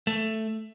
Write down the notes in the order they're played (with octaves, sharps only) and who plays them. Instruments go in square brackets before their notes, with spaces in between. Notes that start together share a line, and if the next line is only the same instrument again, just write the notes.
[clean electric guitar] A3